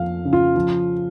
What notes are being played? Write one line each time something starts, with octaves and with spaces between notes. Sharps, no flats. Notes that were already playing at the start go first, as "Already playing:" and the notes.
Already playing: F2 F3 F5
C#3
F4
F3